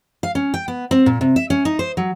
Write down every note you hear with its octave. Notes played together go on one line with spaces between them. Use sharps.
F5
C#4
G5
B3
C4
A#2
C3
E5
C#4
D#4
C5
F#3